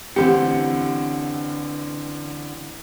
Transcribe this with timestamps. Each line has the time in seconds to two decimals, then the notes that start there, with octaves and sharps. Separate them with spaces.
0.16 A1 D3 C4 G4 C#7